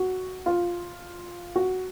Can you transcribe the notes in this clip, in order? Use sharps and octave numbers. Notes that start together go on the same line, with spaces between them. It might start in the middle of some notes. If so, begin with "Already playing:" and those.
Already playing: F#4
F4
F#4